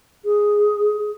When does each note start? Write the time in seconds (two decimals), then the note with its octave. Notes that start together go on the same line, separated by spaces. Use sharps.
0.25 G#4